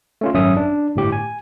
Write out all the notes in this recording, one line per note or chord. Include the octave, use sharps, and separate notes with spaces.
A3 C#4 F4
G#1 F#2 C#4 E5 D#6
D4
G1 A2 G4
G#5